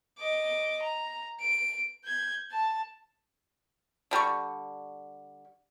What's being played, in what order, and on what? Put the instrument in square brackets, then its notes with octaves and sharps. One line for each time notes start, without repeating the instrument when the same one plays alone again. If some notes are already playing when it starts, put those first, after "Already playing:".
[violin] D#5 D6
A#5
D7
G6 G#6
A5
[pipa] D3 G3 A4 C#6